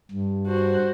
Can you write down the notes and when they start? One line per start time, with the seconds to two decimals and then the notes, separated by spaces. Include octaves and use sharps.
0.11 G2
0.47 F#4 C5